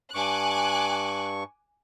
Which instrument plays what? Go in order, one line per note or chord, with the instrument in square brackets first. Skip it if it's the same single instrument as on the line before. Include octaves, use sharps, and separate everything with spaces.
[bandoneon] G2 C#6 [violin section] G#5 D6 F#6